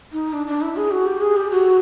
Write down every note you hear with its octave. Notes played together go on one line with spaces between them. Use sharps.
D#4
D4
D4
E4
G#4
F#4
G4
G#4
G4
F#4